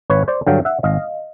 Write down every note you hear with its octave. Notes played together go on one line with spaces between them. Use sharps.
G#1 B4 C#5
C5 D5
G2 D3 F#3 F5 G5
E5 F#5
G#1 D#5 F5